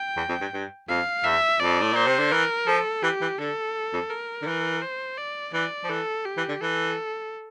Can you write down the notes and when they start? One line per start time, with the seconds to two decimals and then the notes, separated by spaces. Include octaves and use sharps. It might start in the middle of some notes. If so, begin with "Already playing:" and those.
Already playing: G5
0.17 E2
0.29 F2
0.41 G2
0.53 G2
0.88 F2 F5
1.24 E2 E5
1.59 F2 D5
1.81 A2
1.93 A#2 C5
2.06 C3
2.19 D3
2.32 E3 A#4
2.67 F3 A4
3.03 E3 G4
3.21 E3
3.39 D3 A4
3.93 F2
4.10 A#4
4.42 D3
4.47 E3
4.82 C5
5.18 D5
5.53 E3 D5
5.84 F3
5.89 E3 A4
6.25 G4
6.37 E3
6.49 D3
6.61 E3 A4